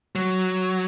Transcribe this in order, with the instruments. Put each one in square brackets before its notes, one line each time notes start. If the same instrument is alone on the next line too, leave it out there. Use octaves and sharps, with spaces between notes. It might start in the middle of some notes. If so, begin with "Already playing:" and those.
[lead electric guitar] F#3